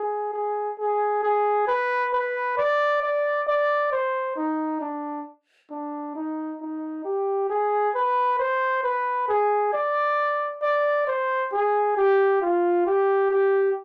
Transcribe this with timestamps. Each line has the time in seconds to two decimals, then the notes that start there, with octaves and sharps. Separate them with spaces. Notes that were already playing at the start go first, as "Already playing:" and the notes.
Already playing: G#4
0.34 G#4
0.79 G#4
1.23 G#4
1.68 B4
2.13 B4
2.58 D5
3.02 D5
3.47 D5
3.92 C5
4.37 D#4
4.81 D4
5.71 D4
6.16 D#4
6.61 D#4
7.05 G4
7.50 G#4
7.95 B4
8.39 C5
8.84 B4
9.28 G#4
9.73 D5
10.62 D5
11.07 C5
11.53 G#4
11.97 G4
12.42 F4
12.87 G4
13.31 G4